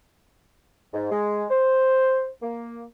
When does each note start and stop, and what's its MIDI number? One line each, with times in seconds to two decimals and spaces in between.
0.94 1.10 44
1.11 1.45 56
1.50 2.28 72
2.42 2.83 58